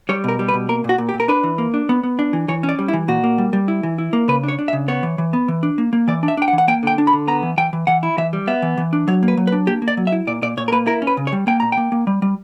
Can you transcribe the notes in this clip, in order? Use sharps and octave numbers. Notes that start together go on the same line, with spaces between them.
G3 C#5
B2 A#4
G3
B4
B2
A#3 A#4
A#2 F#4
A#2
G4
A#2
A#4
D4 B4
E3
A#3
D4
B3
B3
D4
E3
E3 C#5
C#4
D5
G3
E4
E3
A#2 F#4
A#3
G3
G3
E4
E3
E4
A#3
C#3 B4
D4 C#5
D4
E5
C#3
B3 C#5
E3
E3
B3
E3
D4
A#3
A#3
E3 D5
D4
E5
D4 G5
F#5
E3
F#5
A#3 G5
D3 G5
D4
B5
D3
B3 A#5
E3
E3 G5
E3
E3 F#5
E4
E3 E5
G3
B3 E5
E3
E3
D4
F#3 C#5
A#3
B4
F#3
B4
D4
A#3 G4
A#3
D5
F#3
E5
E4
A#2 D5
A#2 D5
A#2 C#5
A#4
A#3 B4
E4 A#4
C#4
B4
C#3
C#5
G3
A#3 G5
A#2 A#5
A#3 G5
A#3
G3
G3